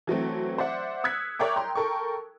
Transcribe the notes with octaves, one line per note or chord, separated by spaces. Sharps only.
E3 F#3 A3 C4
C5 D5 E5 F#5
D#6 E6 F#6 G#6 B6 C#7
A#4 C#5 D5 E5 G5 D6
G5 A#5 C6
A4 A#4 G5 C#6